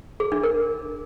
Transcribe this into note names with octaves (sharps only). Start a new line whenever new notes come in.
G#4
D4
A#4